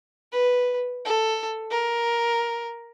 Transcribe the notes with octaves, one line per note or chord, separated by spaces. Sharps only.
B4
A4
A#4